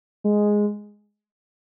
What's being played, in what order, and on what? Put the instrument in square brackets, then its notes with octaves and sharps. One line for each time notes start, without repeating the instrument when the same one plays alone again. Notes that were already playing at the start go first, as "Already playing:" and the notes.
[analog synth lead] G#3